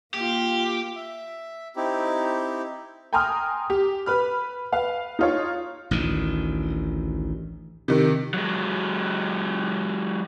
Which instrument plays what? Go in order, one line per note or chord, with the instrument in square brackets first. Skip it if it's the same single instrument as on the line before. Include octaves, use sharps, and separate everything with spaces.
[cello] A#3 F4 [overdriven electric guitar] G4
[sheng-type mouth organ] E5
C4 D#4 E4 G4
[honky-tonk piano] G5 G#5 A#5 C6 D#6 F6
G4
B4 B5 F6
B4 F5
D#4 F4 C#5
[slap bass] A1 D2 D#3
[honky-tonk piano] C3 D#3
[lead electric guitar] F#3 G#3